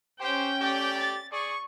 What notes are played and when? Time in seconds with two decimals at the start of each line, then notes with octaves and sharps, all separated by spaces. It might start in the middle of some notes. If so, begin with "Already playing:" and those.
0.20 C#4 G4 C5 G5
0.61 A3 G4 D5
0.99 A6
1.32 G#4 D5 C#6